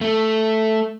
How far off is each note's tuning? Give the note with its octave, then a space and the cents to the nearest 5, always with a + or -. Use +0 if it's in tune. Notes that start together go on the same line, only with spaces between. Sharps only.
A3 +0